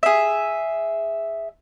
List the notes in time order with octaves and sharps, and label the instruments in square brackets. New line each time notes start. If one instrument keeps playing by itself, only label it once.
[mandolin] G#4 E5